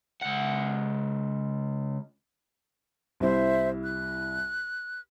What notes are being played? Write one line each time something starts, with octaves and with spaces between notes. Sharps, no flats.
C#2 F#5
C2 E4 C5 E5
F#6